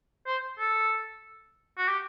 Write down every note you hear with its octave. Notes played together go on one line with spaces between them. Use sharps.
C5
A4
F#4
G4